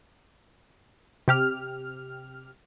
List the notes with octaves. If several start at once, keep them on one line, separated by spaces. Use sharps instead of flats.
C3 G4 F6